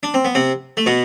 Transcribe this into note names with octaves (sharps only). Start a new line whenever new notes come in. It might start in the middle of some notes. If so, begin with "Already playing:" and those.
D4
C4
B3
C3 C4
A3
B2 B3